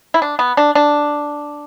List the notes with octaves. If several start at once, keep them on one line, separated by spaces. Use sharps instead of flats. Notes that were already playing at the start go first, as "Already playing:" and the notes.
E4
D4
B3
D4
D4